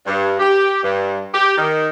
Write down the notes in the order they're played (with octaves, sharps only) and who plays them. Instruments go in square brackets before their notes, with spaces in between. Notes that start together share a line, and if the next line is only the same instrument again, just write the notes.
[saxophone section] G2
G4
G2
G4
D#3